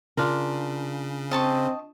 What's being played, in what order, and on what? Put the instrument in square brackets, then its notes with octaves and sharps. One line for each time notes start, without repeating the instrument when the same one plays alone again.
[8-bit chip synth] C#3 [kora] D4 F4 A#4
[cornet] C4 [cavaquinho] D#5 A5 C#6